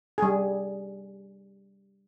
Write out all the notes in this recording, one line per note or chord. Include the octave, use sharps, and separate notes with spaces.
G3 G#4